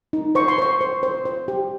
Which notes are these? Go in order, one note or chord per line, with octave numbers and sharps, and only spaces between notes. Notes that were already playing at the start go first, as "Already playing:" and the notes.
D#4
C5 C#6
C6
C5 C#6
C5
C5
C5
G4